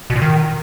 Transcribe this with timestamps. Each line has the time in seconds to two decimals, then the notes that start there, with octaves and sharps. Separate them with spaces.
0.10 B2
0.16 A#2
0.22 D#3